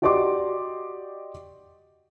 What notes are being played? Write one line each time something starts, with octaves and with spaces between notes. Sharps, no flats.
F#4 G4 D5 D#5 C6 D6